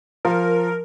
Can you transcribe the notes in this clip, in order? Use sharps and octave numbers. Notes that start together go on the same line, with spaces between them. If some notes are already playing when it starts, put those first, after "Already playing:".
F3 A#4